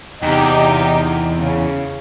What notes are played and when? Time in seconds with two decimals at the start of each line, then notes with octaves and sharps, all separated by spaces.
0.23 E2 C3 D#4 G4
1.37 C#3